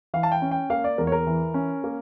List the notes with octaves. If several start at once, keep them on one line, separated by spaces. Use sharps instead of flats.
E3 F5
A5
G5
C#4
G5
A#3 F5
D5
E2 A#4
C#5
A#4
E3
C#4
A#3